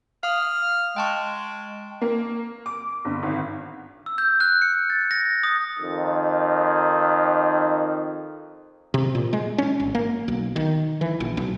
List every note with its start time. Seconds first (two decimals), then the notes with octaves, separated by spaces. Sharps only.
0.23 F5 D#6 F6
0.96 G#3 G5 A5 C#6
2.01 A#3
2.66 D6
3.05 G1
3.23 G#1
4.06 E6
4.18 G6
4.40 F#6
4.62 C#7
4.90 A6
5.11 A#6
5.43 D#6
5.80 F2 D#3
8.94 C3
9.15 A#2
9.33 G#3
9.58 C#4
9.80 G#1
9.95 A#3
10.28 B1
10.56 D#3
11.01 E3
11.20 A#1
11.37 B1